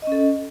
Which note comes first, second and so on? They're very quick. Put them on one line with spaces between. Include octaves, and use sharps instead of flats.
D#5 C#4 A4